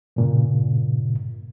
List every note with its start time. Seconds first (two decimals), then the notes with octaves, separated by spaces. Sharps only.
0.16 G2 A#2 C#3